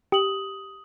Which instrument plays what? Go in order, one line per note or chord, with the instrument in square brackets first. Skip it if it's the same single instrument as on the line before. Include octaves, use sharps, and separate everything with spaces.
[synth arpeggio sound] G4 [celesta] D#6 F#7